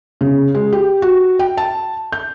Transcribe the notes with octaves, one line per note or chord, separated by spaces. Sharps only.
C#3
G#3
G4
F#4
G5
A5
G6